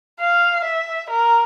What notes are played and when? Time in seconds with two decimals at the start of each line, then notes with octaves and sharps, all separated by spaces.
0.20 F5
0.65 E5
1.10 A#4